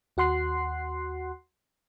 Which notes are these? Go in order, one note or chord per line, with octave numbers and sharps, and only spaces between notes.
D#2 F#4 F#5 C6 F#6 C7